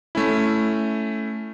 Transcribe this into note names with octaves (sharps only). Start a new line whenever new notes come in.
A3 C#4 E4